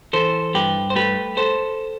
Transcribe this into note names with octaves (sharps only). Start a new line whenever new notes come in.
E3 A4 C5
G2 G4 B4
C5
A3 G4 B4
A4 C5